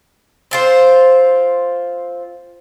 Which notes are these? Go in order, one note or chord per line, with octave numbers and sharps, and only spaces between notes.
C4 F4 C5